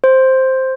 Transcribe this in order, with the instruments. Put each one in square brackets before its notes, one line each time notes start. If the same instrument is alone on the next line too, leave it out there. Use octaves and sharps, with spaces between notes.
[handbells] C5